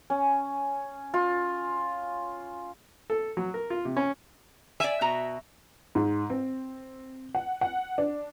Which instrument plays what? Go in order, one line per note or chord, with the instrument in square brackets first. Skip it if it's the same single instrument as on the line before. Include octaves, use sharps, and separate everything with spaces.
[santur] C#4
F4
[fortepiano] A4
F#3
A#4
F4
C3
C#4
[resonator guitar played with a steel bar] D5 G#5 [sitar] E5
[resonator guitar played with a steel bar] B2 F#4 A#5
[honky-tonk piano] G#2
C4
F#5
F#5
D4